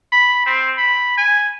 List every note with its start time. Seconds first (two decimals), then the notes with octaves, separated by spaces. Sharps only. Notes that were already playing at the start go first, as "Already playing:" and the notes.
0.12 B5
0.46 C4
0.78 B5
1.18 G#5